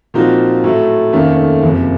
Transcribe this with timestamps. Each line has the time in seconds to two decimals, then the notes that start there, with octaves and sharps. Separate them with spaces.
0.14 A#2 F3 C4 D#4 F#4
0.64 A2 F#3 A3
1.13 F1 D#2 D#3 A3 C#4
1.63 F#1 F2 C3